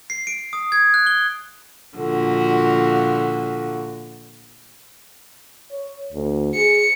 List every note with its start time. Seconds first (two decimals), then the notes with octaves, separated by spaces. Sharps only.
0.10 C7
0.27 D7
0.53 D#6
0.72 G#6
0.94 F#6
1.07 G7
1.97 A#2 D3 F3 F#4
5.71 C#5
6.13 D2
6.54 G#4 C#7